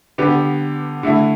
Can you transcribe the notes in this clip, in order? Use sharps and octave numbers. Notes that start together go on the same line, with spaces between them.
D3 B3 G4
D3 A3 E4